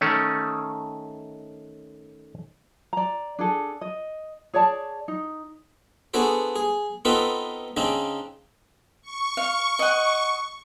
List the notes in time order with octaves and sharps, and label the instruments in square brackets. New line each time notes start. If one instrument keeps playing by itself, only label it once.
[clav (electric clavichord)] D#3 A3 C#4
[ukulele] D5 A#5
D4 G#4 A4
D#5
G#4 C#5 D5 A5
D#4
[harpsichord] B3 D4 F#4 G#4 A4 C5
G#4
B3 C4 D#4 F4 A4 B4
C#3 C4 D4 D#4
[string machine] C#6
[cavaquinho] F5
D#5 F#5